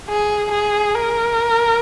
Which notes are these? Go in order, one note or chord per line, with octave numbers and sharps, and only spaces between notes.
G#4
G#4
A#4